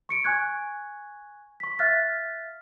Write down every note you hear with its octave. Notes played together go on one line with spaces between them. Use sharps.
C#6 C#7 D7
G#5 C#6 F#6 G#6
C#6 B6
E5 F5 F6 F#6 A6 B6